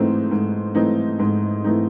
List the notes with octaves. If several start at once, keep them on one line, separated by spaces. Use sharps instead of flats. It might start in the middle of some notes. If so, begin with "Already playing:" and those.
Already playing: G#2 E3 A3 C4 D#4
G#2
E3 A3 C4 D#4
G#2
E3 A3 C4 D#4